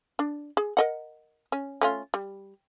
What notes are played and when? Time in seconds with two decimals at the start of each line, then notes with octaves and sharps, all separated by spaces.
0.19 D4
0.57 G#4
0.77 A#4 D#5 F#5
1.52 C#4
1.81 A3 C#4 F4
2.14 G3